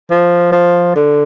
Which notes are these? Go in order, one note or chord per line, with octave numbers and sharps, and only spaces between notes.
F3
F3
D3